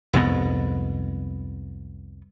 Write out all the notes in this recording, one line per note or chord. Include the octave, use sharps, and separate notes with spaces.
C2 F2 G#2 B3